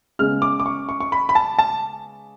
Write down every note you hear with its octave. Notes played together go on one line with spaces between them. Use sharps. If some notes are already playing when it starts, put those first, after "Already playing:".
C#3 G#3 B3 F6
D6
D6
C#6
C#6
C#6
B5
B5
A5
A5